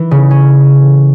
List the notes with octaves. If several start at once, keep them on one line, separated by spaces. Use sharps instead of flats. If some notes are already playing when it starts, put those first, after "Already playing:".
Already playing: E3
C#3
C#4